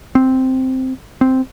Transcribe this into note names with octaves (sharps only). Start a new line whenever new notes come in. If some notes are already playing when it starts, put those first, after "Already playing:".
C4
C4